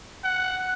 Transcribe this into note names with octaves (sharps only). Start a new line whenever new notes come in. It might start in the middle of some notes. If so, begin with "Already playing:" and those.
F#5